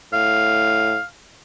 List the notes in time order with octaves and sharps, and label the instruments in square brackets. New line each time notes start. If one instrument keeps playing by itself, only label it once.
[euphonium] A2 [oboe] F5